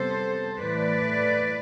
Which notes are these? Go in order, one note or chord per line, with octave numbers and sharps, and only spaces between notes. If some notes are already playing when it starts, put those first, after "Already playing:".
Already playing: C3 G3 B3 A4 C5
A2 E3 A3 B4 D5